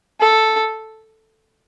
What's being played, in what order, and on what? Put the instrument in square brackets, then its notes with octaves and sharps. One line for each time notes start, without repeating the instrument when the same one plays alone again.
[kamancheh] A4